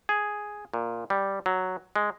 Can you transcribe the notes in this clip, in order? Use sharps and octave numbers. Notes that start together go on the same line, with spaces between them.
G#4
A#2
G3
F#3
G#3